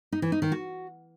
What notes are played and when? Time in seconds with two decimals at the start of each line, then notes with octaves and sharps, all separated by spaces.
0.12 D#4
0.22 E3
0.32 D#4
0.42 D#3
0.52 F#4